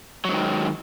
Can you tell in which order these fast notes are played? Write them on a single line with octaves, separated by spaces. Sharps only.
F#3 G#2 D#3